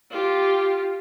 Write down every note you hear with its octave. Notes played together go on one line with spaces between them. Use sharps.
F4 G4